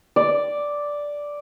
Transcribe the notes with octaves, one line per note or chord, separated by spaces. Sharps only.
D5